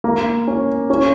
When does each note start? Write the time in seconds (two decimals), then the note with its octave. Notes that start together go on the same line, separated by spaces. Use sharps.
0.04 A#3
0.48 C#4
0.90 C#4